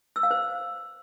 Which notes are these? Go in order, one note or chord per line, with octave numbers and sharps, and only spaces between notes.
E6
F5
C5